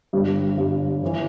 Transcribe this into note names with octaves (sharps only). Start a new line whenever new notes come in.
G1 G2 G3
G1 G2 G3
G1 E3